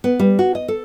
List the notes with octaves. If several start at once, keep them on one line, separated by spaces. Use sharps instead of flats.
B3
G3
F#4
D#5
A4